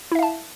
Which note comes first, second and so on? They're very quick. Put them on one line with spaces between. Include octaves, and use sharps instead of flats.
E4 E5 F5 A5